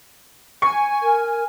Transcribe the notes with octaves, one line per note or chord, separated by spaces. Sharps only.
G#5 C#6
A#4